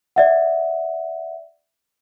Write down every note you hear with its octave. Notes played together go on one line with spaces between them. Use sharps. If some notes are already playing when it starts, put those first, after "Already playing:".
D5 E5 F#5